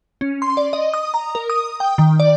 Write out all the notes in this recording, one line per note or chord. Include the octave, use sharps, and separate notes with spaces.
C#4
C6
D5
D#5
D#6
A#5
A#4
D#6
G5
D#3
D5